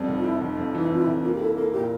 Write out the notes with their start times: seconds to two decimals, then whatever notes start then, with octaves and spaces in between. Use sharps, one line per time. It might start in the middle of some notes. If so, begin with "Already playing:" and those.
Already playing: F2 G3
0.08 F1
0.17 F4
0.24 F2 E4
0.41 F1
0.57 F2
0.75 E3
0.80 E4
0.91 F2 F4
1.02 E4
1.07 F1
1.24 A#3 F4
1.34 G4
1.41 E4 A4
1.57 A#3 A4
1.73 A#2 G4